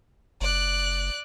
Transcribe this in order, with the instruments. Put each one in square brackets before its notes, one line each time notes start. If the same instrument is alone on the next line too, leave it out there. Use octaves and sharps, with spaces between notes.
[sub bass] F#1 [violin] D5 F#6